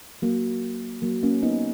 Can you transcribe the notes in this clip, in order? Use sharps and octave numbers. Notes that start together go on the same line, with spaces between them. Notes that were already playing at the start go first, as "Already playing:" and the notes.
F#3 A#3
F#3 A#3
A#3 C#4
B3 D#4